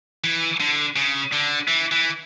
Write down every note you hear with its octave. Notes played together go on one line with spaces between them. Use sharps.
E3
D3
C#3
D3
E3
E3